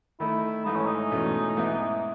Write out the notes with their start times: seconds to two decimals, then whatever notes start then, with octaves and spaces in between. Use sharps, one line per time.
0.20 D#3 A3 D#4 E4
0.66 G#2 E3 A3 D#4 E4
0.76 C#4
0.86 D#4
1.11 E2 B2 A3 C#4
1.57 G#2 E3 B3 E4